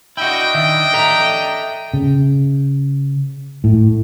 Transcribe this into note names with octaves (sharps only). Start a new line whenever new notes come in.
D4 E4 F#4 D#5 G5
D#3 E5
A4 E5 A#5
C#3
A2